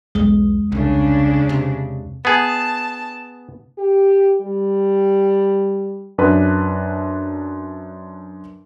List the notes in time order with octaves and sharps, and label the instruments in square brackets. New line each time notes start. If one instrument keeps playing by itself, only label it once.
[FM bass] B1 [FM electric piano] E2 G#3
[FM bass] C2 [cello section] C#3 D4
[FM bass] C3
[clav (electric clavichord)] B3 G#4 [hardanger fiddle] A5
[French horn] G4
G3
[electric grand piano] F#2 D4 B4